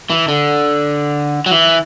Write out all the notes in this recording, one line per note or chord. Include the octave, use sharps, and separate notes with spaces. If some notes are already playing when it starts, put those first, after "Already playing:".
E3
D3
F#3
E3